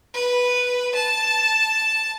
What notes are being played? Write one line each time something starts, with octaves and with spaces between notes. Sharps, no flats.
B4
A5